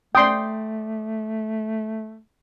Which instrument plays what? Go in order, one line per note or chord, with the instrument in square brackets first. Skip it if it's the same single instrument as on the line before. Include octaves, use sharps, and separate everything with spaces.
[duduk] A3 [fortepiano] D5 D#6 [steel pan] G5 C6